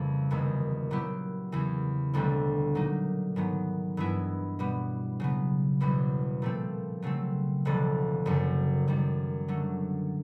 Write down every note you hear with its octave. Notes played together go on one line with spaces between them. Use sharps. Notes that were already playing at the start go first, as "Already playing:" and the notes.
Already playing: F2 C#3 E3 G3 A#3
F#1 E2 C3 D#3 G#3
A#2 F#3 B3 E4 G4
E2 C#3 E3
E1 D2 D3 G3 C4
A#2 F#3 A#3 D#4
G#2 D#3 F#3 B3
G2 E3 G#3 B3 E4
B2 G3 B3
C#3 F#3 B3
E1 E2 B2 G3
A#2 F3 A3 C4
C#3 F#3 A3 C4
E1 D2 D3 F3
F#1 F#2 C#3
F#2 D#3 G3
D3 F#3 A3